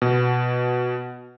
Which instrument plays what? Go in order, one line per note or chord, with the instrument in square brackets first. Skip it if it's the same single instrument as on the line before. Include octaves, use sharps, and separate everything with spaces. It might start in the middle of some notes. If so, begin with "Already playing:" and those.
[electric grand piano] B2